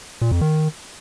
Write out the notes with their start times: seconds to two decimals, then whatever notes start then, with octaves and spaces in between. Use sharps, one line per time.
0.21 A#2
0.31 F2
0.41 D#3